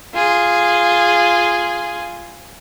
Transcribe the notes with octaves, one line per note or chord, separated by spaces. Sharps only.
F4 G#4